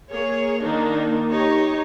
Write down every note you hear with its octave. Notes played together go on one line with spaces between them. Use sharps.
A#3 G#4 C#5
D#3 A#3 D4 D#4
D#4 G4 C#5